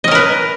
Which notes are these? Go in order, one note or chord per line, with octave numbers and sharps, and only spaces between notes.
C#4 A#4 B4 D#5